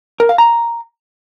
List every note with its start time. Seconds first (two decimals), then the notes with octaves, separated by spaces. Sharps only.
0.20 A#4
0.29 F5
0.38 A#5